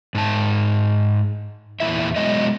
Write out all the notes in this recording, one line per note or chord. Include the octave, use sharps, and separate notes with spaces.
G#2 A5
E2 A#2 D3 E4 E5
B2 F#3 G#3 D#5